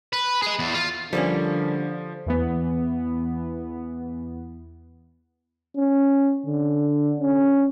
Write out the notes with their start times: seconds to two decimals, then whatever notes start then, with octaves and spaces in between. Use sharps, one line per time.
0.13 B4
0.42 G#4 D#5
0.59 E2
0.74 F4
1.13 D3 F3 G3 A#3 C#4
2.26 E2 E3 B3
5.77 C#4
6.46 D3
7.20 C#4